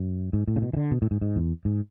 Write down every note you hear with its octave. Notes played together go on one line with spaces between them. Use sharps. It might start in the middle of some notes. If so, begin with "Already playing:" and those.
Already playing: F#2
G#2
A2
C#3
B2
E3
D3
B2
A2
G#2
G#2
E2
G#2